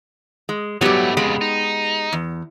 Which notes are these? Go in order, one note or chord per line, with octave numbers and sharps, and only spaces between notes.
G#3
G#2 F#3 G3 A3 B3 G4
F2 C#3 G#3 B5
D#4
E2